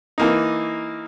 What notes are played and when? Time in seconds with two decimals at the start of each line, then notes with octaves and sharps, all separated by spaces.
0.18 E3 A#3 D#4